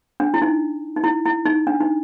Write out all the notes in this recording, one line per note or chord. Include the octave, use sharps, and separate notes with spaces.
D4
E4
D#4
D#4
E4
E4
D#4
D4
D#4